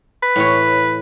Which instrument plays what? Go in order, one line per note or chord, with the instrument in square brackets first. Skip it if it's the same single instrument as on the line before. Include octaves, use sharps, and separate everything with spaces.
[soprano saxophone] B4
[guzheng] A2 E3 C#5